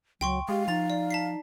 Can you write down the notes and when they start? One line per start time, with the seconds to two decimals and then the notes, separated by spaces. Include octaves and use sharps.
0.21 C#2 F#3 G5 C6 C#6
0.49 G#3 G4 F5
0.68 F3 D#4 A6 F7
0.90 D5
1.10 A5 B6 C7